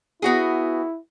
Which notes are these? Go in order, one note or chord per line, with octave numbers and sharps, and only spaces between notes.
B3 E4 F#4 G#4